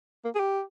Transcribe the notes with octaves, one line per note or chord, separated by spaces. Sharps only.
A#3
G#4
G4